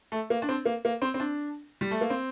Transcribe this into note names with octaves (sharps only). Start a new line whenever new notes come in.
A3
A#3
D4
C4
A#3
A#3
C4
C4
D4
G3
A3
A#3
C4